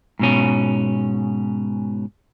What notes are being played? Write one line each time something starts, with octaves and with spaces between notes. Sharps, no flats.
G#2 B2 C#4